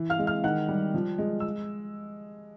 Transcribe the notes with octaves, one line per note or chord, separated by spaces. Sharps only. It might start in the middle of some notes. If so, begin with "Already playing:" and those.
Already playing: E3
F5 F6
G#3
F5 F6
D#3 F#5 F#6
G3
F3
G#3
E6